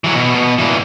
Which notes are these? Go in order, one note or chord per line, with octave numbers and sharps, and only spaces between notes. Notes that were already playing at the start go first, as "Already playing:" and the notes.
E3 F#3
B2
B2
A#2 E3